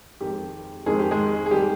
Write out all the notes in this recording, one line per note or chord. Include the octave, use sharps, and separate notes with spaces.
F2 D#3 G#3 G4
F2 D#3 G#3 G#4
G4
G#3 G#4
G#4
D#3 G3 G4